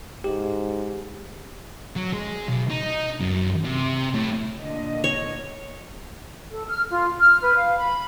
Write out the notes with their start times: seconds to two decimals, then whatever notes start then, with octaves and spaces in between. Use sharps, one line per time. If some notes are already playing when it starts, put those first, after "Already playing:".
0.24 G#2 G4
1.96 F#3
2.13 G#3
2.48 B1
2.70 D#4
3.20 F#2
3.64 C3
4.14 A2
4.61 A#2 D3 D#5
5.04 C#5
6.50 A4
6.68 F6
6.90 F4
7.19 F6
7.41 B4
7.56 F5
7.77 B5